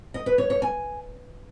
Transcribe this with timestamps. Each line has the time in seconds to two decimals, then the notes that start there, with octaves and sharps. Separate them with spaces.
0.14 D#5
0.26 B4
0.38 C#5
0.50 C#5
0.62 G#5